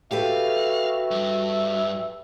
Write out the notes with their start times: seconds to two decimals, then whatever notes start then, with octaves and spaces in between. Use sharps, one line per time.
0.11 F#4 G4 A4 B4 E5 F5
1.11 G2